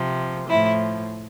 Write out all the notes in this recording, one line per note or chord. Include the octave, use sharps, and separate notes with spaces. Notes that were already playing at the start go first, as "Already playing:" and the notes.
Already playing: C3 F3
A2 F3 E4